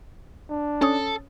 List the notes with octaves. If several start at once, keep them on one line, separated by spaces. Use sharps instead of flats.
D4
C#4 A4 C#5 D#6